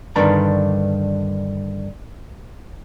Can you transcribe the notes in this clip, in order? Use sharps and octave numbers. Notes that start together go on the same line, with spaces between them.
G2 D3 D#3 B3 D4 A#5